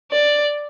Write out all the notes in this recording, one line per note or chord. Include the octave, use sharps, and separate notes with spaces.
D5